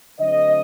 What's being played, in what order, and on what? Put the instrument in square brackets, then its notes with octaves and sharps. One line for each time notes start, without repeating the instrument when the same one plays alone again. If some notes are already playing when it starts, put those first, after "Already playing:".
[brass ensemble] D3 F#3 A3 C4 D#5